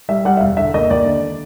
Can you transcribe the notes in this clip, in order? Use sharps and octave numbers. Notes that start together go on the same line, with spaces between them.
G3 E5
G3 F#5
E5
E1 F5
D3 E5
D#2 D#5
D#2 D5
D3